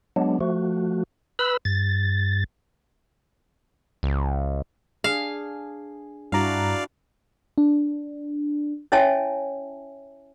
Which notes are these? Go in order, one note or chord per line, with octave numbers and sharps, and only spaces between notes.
F#3 G#3 B3 D4
F3 A3 F#4
B4 B5 E6
G2 A6
C#2
D4 G#4 F5
G2 D4 E4 F#4 D5 F5 A#5
D4
C#4 E4 C#5 E5 G#5 A5